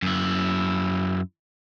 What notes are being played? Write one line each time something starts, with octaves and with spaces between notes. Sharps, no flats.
F#2 E4